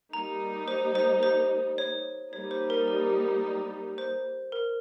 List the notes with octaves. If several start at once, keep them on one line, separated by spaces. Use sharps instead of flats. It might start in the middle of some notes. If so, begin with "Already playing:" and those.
G3 A#3 D#4 A#5
C5
C5
C5
C#5
G3 A#3 D#4 C#5
C5
A#4
A#4
C5
A#4